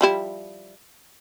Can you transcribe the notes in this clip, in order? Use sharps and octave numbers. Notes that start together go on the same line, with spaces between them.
F3 G3 E4